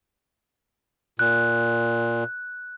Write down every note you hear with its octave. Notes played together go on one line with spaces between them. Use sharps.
A#2 F#6